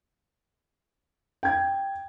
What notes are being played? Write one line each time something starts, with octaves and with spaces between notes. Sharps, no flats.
G5 G#6